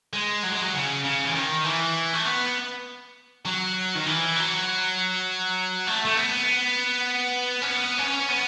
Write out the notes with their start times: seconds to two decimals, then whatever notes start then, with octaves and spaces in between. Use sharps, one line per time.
0.13 G#3
0.43 F#3
0.52 G#3
0.62 F#3
0.74 C#3
1.04 C#3
1.24 E3
1.34 D#3
1.64 E3
2.13 A3
2.25 B3
3.45 F#3
3.95 D#3
4.06 E3
4.36 F#3
5.87 A3
6.05 A3
6.17 B3
7.62 C#4
7.68 B3
7.98 C#4
8.29 B3